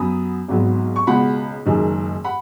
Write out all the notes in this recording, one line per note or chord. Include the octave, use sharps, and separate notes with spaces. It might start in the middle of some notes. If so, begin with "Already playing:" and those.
Already playing: F#2 F#3 B3 B5 D#6
G#1 G#2 F#3 B3
C#6
C#2 B2 G#3 B3 F#5 B5
F#1 F#2 D#3 G#3
F#5 B5